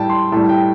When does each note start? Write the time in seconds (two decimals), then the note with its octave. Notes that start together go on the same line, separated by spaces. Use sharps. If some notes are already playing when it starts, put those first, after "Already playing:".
Already playing: A2 G3 G5 A5
0.10 C6
0.32 A2 G3 A5
0.49 G5